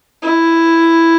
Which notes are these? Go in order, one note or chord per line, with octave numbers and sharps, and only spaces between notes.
E4